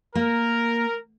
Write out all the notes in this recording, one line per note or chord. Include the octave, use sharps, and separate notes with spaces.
A#3 A#4